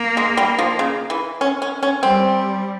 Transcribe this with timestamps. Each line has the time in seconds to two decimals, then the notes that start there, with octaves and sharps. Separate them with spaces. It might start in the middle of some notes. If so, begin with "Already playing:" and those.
Already playing: A#3
0.17 G#3
0.37 G3
0.59 F3
0.79 C#3
1.10 E3
1.41 C#4
1.62 C#4
1.83 C#4
2.03 G3 C4